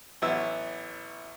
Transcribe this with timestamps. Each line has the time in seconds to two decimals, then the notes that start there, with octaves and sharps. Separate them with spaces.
0.22 A1 F#3 B3 E4 E6